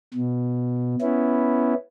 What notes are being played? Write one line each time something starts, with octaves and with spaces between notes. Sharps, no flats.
B2
B3 C#4 E4